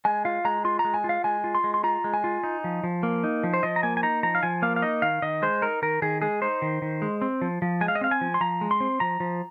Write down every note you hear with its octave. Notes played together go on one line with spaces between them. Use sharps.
G#3 G#5
F4 F5
G#3 A#5
F4 C6
A#5
G#3
G#5
F4
F5
G#3 G#5
F4
C6
G#3
C6
F4 A#5
G#3
G#5
F4
D#4
F3
F3
A#3
D#4
F3
C5
F3 D#5
A#5
A#3 G#5
G#5
D#4 A#5
F3 A#5
F5
F3 G#5
A#3 F5
F5
D#4 D#5
D#3 F5
D#3 D#5
G#3 C5
D#4 A#4
D#3 A#4
D#3 G#4
G#3 G#4
D#4 C5
D#3
D#3
G#3
C4
F3
F3
G#3 G#5
F5
D#5
C4 F5
G#5
F3
C6
F3 A#5
G#3
C6
C4
F3 A#5
F3